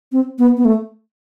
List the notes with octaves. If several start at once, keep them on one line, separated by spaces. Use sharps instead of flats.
C4
B3
B3
A3